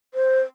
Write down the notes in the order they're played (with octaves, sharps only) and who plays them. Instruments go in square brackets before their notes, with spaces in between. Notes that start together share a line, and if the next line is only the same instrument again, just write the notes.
[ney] C5